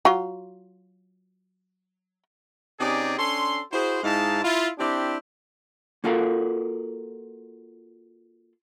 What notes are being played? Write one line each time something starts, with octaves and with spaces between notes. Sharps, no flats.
F#3 F4
C3 C#4 D#4 G4 G#4 D5
C#4 D4 A4 C6
E4 F#4 G#4 C5
G#2 G#3 D#4 E4 F5 A5
E4 F4
C4 D4 E4 G4
A#3 F4 F#4 A4 A#4 F5